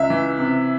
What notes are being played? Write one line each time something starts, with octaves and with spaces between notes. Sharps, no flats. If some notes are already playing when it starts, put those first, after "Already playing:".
Already playing: C#2 E5
E3
C3